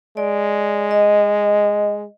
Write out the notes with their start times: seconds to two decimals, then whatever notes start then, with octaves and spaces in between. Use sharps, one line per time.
0.17 G#3 D5
0.91 D#5